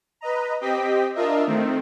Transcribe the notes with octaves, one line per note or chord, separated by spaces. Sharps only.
B4 D#5 A#5
C4 G4 D#5 G5 B6
D4 F4 A#4 D#5 E5
D#3 A3 C4